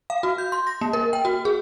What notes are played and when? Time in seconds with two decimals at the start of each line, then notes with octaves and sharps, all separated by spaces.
0.10 F5
0.23 F#4
0.38 G6
0.52 C6
0.67 A#6
0.81 A#3
0.93 A#4
1.13 G5
1.25 F#4
1.45 G#4